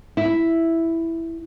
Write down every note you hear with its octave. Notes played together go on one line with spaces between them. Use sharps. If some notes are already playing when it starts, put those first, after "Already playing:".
E4